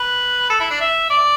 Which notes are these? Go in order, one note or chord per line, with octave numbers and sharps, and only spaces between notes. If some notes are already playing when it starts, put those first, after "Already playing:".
Already playing: B4
A4
E4
D4
E5
D5